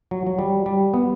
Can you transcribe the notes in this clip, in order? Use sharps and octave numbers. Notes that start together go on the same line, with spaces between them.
F#3
F#3
G3
G3
B3